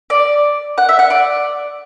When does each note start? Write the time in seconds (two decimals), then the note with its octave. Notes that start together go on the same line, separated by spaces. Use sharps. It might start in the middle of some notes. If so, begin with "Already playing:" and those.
0.10 D5
0.78 F#5
0.89 E5
0.99 F#5
1.10 D5